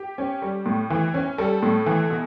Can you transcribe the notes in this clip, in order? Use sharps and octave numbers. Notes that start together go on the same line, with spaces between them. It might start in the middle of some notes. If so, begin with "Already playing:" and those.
Already playing: G4
C#4
G3
A2
E3
C#4
G3 A4
A2
E3
B2